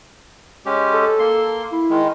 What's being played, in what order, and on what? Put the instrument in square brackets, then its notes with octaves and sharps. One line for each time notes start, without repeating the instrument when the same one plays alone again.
[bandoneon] G#3 C#4 G4
[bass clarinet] A4
[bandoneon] A#3 C6
[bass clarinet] E4
[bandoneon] D#3 G#3